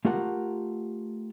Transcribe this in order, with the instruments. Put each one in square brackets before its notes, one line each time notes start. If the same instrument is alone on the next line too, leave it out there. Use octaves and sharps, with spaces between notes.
[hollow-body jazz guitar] A3 F4 G4 A#4 F#5